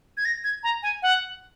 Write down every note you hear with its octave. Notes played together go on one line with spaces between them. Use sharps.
G#6
A#6
G#6
A#5
G#5
F#5